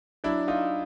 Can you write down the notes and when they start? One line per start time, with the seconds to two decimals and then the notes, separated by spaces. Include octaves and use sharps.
0.24 F#3 D4 E4
0.48 D#4 F4